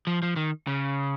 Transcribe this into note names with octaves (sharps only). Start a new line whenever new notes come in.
F3
F3
D#3
C#3